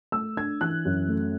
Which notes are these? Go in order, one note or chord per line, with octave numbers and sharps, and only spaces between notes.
A3 E6
D4 G#6
E3 F#6
F#2
A3